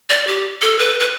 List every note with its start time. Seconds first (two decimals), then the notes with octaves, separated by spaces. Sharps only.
0.10 D5
0.27 G4
0.61 A4
0.79 B4
1.00 B4